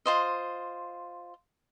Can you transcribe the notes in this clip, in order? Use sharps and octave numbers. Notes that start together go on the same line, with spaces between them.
F4 C5 D#5